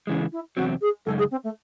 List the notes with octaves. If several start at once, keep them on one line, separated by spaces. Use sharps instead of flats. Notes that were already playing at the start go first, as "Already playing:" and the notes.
C#3 E3 G#3 C#4
E4
E2 C3 F#3 C4 F#4
G#4
F#2 C#3 G#3 D#4 A4
G#4
C4
A3